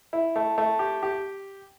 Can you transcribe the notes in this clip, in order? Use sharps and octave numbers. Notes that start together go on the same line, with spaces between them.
E4
A3
A3
G4
G4